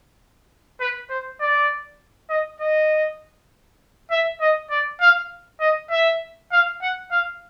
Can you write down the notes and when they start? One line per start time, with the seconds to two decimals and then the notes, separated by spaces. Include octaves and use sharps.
0.81 B4
1.10 C5
1.40 D5
2.30 D#5
2.61 D#5
4.11 E5
4.41 D#5
4.70 D5
5.01 F5
5.61 D#5
5.91 E5
6.52 F5
6.82 F#5
7.11 F5